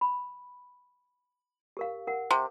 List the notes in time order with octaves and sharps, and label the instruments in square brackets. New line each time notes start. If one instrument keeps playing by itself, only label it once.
[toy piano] B5
G4 A#4 F5
A#4 F#5
[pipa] C3